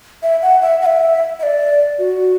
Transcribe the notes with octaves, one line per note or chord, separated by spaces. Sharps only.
E5
F#5
E5
F#5
E5
E5
D5
F#4